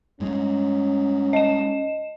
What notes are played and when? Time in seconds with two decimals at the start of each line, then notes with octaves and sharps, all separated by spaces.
0.20 G2 G#3 C#4
1.33 D#5 E7